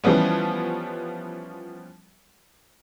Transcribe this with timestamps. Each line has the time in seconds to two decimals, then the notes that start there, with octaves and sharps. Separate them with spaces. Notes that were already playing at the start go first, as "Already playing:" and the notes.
0.04 E3 F3 G3 B3 C#4